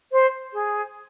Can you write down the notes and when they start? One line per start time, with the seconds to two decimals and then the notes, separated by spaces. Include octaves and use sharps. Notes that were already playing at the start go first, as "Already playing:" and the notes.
0.12 C5
0.53 G#4